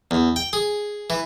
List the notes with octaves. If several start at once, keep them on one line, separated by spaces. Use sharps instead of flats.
E2
G5
G#4
E3